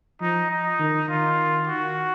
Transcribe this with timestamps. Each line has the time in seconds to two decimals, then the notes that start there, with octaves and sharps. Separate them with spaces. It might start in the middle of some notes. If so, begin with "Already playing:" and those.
0.21 F3 D#4
0.51 D#4
0.79 D#3
1.09 D#3 F4
1.67 F#4